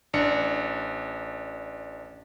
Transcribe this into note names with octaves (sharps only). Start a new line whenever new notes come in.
A1 D4 C#7